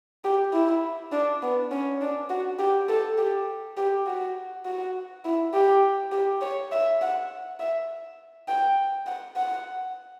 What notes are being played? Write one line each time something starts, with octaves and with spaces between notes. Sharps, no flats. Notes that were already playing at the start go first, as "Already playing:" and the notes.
G4
E4
D4
B3
C#4
D4
F#4
G4
A4
G4
G4
F#4
F#4
E4
G4
G4
C#5
E5
F#5
E5
G5
F#5
F#5